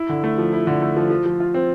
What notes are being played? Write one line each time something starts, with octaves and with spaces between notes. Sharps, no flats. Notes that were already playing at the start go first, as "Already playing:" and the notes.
Already playing: E4
D3
A3
F3
E4
D3
A3
F3
F3
F3
F4
C4